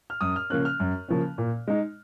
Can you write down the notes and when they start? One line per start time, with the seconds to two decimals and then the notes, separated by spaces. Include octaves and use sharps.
0.10 F6
0.21 F#2 D#6
0.36 F6
0.50 C#3 F3 A#3 C#4 F#6
0.65 F6
0.80 F#2
1.08 C#3 F3 A#3 C#4
1.38 A#2
1.67 G#3 D#4